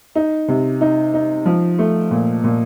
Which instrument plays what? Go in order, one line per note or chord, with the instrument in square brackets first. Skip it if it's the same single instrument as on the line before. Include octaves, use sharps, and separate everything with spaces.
[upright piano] D#4
C3
D#4
D#4
F3
A3
A#2
A#2